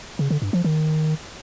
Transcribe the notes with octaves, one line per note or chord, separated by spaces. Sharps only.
C#3
D3
G2
F3
D#3